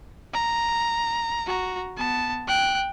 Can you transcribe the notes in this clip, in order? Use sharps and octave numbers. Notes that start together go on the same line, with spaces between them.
A#5
F#4 A#5
B3 A5
G5 F#6